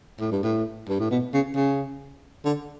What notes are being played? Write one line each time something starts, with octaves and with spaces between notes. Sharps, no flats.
A2
G2
A2
G2
A2
B2
C#3
C#3
D3